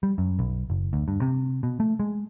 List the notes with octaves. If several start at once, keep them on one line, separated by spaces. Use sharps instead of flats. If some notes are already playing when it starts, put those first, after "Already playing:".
G3
F#2
B1
F#1
D2
G2
C3
B2
A3
G#3